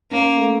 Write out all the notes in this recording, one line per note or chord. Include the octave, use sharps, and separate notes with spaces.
A#3 C#4
A3